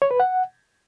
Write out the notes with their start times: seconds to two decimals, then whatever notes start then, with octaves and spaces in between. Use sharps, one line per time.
0.02 C#5
0.11 B4
0.20 F#5